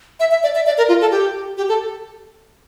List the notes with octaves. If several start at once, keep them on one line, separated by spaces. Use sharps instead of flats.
E5
E5
D5
E5
D5
A#4
F4
A4
G4
G4
A4